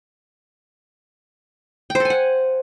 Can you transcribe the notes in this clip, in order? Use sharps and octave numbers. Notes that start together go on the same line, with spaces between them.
G5
C5
A4
G#5
F#5